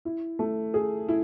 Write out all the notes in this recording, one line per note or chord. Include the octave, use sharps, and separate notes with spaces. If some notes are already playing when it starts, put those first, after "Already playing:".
E4
A3
G#4
E4